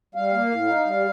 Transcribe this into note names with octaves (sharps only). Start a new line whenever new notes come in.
G3 F5
A#3
A2
D#4
G3